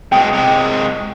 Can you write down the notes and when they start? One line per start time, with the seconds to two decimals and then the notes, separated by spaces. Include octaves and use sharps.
0.12 B2 G#3 G5
0.33 C3 G#3